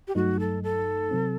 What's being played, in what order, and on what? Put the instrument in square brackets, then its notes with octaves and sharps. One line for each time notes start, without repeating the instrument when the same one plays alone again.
[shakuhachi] G4
[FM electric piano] G2 F#3 A3 D#4 [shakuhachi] F#4
[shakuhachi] A4
A4
[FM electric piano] C3 F#3 C4